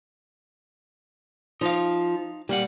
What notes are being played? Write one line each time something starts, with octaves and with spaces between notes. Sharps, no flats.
F3 D#4 F5
A#2 G3 A#3 F#5